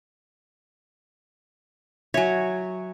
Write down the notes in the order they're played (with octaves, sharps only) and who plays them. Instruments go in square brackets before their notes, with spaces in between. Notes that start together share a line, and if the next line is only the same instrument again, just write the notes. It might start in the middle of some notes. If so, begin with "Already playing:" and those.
[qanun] F#3 C#5 [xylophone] E5 G#5